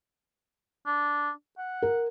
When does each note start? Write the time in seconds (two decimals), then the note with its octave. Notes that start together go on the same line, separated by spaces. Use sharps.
0.86 D4
1.58 F#5
1.82 A#4